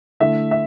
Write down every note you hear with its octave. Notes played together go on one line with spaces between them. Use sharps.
D3 A3 E4 E5
E5